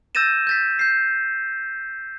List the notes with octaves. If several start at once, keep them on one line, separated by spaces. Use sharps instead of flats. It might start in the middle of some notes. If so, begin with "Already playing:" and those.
E6 G6 A6 A#6 D#7 E7
G6 A6 B6
G6 C7